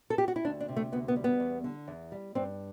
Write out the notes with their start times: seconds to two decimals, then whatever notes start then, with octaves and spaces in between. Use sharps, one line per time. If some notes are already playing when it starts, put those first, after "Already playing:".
0.10 A4
0.18 G4
0.28 F#4
0.36 E4
0.44 D2 D4
0.60 D4
0.68 C3
0.77 A3
0.92 D2 B3
1.08 B3
1.16 G3
1.24 B3
1.40 E2
1.64 D3
1.87 E2
2.12 G3
2.35 G2 C4